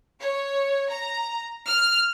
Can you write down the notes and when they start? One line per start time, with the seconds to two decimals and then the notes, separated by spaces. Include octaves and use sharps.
0.19 C#5
0.89 A#5
1.67 F6